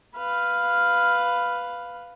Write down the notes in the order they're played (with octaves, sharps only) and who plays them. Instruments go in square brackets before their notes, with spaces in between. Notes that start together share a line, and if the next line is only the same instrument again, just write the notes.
[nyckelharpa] B4 F5